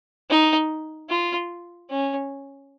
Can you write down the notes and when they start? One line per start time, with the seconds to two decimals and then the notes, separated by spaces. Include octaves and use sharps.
0.30 D#4
1.10 F4
1.90 C#4